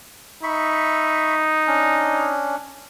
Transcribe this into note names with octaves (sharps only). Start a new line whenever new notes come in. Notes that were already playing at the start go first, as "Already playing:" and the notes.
D#4 E5 B5 C#6
C#4 D4